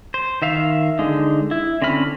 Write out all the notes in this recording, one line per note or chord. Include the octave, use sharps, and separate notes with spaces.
C5
D#3 E5 F5
D3 G#3 D#4
E4
D3 C4 C#4 B5 F6